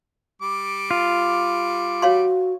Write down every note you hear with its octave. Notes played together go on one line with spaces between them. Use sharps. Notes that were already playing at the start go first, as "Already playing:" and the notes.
G3 D6
F4
F#4 C#5 F5 C6